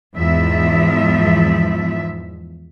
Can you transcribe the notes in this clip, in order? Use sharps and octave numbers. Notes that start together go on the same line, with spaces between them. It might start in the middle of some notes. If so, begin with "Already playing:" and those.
E2 G#2 F3 E5